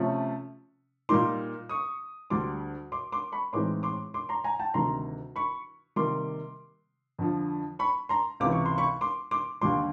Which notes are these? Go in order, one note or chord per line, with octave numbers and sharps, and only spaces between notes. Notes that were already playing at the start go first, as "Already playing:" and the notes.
Already playing: C3 F3 A3 C#4
A#2 G3 A#3 D#4 C6 D6
C#6 D#6
D2 D3 G3 C6 D6
C6 D6
C6 D6
B5 C#6
A2 E3 G#3 C4 D#4 C6 D6
C6 D6
C6 D6
A#5 C6
G#5 A#5
G5 A5
D2 C3 D#3 G3 A#5 C6
B5 C#6
C3 D#3 G3 A#3 C6 D6
F2 D3 F3
B5 C#6
A#5 C6
C#2 C3 E3 D6
C#6
C6
B5 C#6
C6 D6
C6 D6
D#2 D3 G3 C6 D6